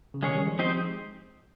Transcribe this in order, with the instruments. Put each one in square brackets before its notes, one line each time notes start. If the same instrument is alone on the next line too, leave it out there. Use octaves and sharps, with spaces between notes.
[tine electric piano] C#3
[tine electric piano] C3 D#3 [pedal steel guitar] G#3 C#4 G#4 C#5
[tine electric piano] D#3 G3
F3 G#3
[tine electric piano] F3 G#3 [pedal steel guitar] C4 D#4 G4 C5 D#5